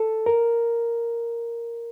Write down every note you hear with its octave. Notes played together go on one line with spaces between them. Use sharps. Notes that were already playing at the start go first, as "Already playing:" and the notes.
Already playing: A4
A#4